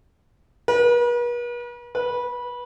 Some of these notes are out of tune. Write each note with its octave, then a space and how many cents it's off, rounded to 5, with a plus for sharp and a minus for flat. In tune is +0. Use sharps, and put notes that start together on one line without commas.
B4 -45
B4 -20